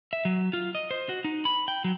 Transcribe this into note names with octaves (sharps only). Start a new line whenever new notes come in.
E5
F#3
F4
D#5
C5
F#4
D#4
B5
G5
F#3